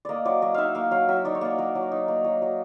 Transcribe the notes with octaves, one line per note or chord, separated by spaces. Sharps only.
A#3 D5 D#5
F#3 D5
F#3 D#5
D#4 E5 F5
A#3 F5
F#3 F5
F#3 E5
D#4 D5
C#5
A#3 D5
F#3
F#3
D#4
A#3
F#3
F#3